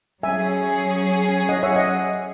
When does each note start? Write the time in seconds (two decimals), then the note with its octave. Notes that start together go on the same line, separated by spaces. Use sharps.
0.23 F#3 C#4 G#4 E5 G#5
1.49 D#5 F#5
1.63 C#5 E5
1.76 D#5 F#5